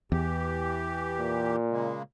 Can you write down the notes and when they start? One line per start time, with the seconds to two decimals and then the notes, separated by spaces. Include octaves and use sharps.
0.12 E2 E3 G4
1.19 A#2
1.71 C#3 G#3 A#3